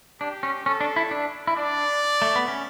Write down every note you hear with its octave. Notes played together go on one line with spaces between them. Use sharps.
D4 G4
C#4
C#4 A4
D4
E4
D4
E4
D4 D5
A3
B3
C#4